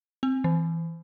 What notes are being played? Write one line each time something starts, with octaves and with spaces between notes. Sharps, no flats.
C4
E3